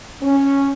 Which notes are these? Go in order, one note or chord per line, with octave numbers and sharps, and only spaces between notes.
C#4